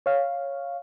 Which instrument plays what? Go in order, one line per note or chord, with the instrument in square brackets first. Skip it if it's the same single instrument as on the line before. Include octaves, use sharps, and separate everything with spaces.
[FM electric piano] C#5 F5